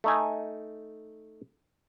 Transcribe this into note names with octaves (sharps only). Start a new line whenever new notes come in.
A3 D#4 G#5